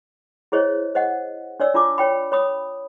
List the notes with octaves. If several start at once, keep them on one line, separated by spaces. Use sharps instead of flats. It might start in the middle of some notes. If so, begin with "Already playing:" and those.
E4 G#4 C5 C#5 D#5
C5 D#5 F#5
D4 C#5 D5 E6
D4 F4 A5 D6
C#5 G5 B5
C#5 B5 D#6